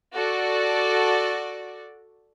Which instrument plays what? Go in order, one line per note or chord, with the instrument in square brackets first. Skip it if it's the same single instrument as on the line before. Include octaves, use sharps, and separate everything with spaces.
[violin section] F#4 A4 D5